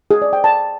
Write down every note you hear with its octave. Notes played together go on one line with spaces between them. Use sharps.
G#4
D5
G5
A5